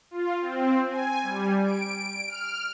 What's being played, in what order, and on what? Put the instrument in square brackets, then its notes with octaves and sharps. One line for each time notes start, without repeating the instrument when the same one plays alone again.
[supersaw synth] F4
C4
G#5
G3
D7
F6